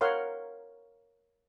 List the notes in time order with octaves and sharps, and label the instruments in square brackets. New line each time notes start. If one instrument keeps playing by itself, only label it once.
[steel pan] A#4 C#5 F5 F#5 C6